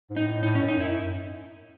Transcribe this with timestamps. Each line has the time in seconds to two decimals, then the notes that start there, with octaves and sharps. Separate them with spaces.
0.10 G#2
0.16 A2 D#4
0.43 A2 D#4
0.55 C#4
0.60 F#2
0.68 D#4
0.77 F#2 E4